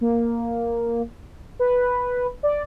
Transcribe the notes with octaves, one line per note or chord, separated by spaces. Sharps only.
A#3
B4
D5